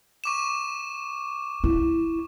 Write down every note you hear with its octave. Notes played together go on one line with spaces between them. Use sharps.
C#6 D6 E7
E4